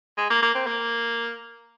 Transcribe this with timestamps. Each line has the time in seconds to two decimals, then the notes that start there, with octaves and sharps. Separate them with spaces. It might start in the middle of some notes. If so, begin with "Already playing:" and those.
0.18 G#3
0.30 A#3
0.42 A#3
0.55 C4
0.67 A#3